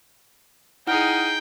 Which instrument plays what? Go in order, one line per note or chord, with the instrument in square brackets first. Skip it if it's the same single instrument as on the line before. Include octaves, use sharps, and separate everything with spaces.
[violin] D#4 G#4 [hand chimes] E4 F#5 F6 [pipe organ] G5